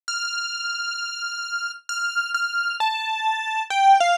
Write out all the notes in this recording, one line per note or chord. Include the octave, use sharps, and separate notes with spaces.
F6
F6
F6
A5
G5
F5